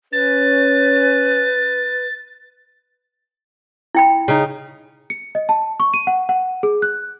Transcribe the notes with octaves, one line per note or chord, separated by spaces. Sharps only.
C#4 B4 A6
E4 G5 B5
C#3 D#4
C#7
D#5
A5
C#6
D#7
F#5
F#5
G#4
F#6